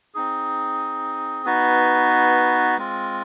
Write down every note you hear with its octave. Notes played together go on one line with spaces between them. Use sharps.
C4 D#4 G#4
B3 D#4 F#4 B4
G#3 C4 F4